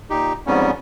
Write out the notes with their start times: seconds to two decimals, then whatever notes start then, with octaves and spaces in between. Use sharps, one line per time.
0.10 A#2 D#4 G4
0.47 F2 G#2 G3 B3 C#4